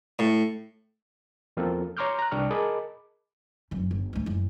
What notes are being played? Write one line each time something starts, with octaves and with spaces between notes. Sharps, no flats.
A2
E2 F3 A#3 C4 F4 A4
C#5 A#5 C6 D6 F6 G6
A#5 F#6
C2 D4 G5 C#6 F6
G#4 A#4 D#5 A5 B5 D6
F1 F#2
G1
D2 G#2
F#1 E3